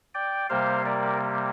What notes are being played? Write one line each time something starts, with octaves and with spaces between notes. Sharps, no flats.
D5 G5
C3 G3 A#3 C5 F5
A#4 D5